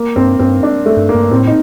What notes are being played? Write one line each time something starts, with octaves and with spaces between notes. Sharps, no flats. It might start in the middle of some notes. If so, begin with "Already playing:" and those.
Already playing: A#3
G2 C4
G2 C4
D4
A3
G2
A#3
G2
A2 C4
D#4